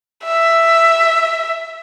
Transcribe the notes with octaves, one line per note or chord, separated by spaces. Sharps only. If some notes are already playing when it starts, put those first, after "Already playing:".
E5